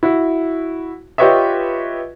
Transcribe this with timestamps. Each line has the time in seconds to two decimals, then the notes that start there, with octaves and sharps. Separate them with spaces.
0.03 E4 F#4
1.18 F4 G4 B4 C#5 D#5 E5